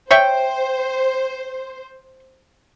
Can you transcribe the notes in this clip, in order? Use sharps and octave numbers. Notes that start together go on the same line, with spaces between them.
C5 C#5 E5 G5